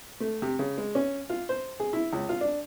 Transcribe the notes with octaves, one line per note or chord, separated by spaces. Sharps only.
A3
C3
C#3
G#3
C#4
F4
C5
G#4
E4
C#2
F4
D4